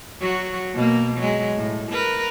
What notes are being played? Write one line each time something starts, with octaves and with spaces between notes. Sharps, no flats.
F#3 F#4
B2 A#3
F#3 G#3
A2
A#4 B4